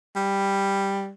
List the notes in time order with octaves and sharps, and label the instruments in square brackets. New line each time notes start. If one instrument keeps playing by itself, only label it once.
[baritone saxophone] G3